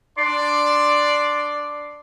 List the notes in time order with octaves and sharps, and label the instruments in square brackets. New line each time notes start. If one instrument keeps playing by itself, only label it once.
[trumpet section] D4 D5 [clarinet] C6